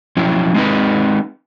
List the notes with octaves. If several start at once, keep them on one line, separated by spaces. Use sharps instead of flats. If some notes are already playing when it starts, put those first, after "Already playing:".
F3 F#3 C#4 E4
G#3 C4 D#4 B4